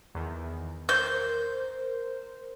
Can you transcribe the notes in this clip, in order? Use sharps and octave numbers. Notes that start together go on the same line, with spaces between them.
E2 D#3
A#4 C5 G6